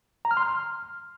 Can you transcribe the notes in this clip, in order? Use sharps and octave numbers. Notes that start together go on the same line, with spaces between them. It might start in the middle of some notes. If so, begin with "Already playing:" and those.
A#5
F6
C6
F6